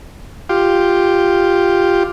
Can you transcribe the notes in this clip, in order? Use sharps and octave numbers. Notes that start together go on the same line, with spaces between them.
F4 G4